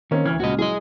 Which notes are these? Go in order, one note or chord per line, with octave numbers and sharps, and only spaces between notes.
D#3 A#3 C4 C#4
D2 E3 F6 G#6
A#2 C#3 G#3 F#4 D#5
F#3 G#3 E4 G#4 D#5